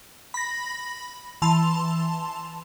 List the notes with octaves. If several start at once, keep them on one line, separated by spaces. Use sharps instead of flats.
B5 A#6
E3 A5 C6 F7